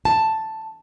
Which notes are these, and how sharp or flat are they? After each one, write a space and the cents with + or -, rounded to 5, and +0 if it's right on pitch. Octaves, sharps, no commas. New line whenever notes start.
A5 +5